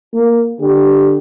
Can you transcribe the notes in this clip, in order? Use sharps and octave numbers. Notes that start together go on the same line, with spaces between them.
A#3
D3 G4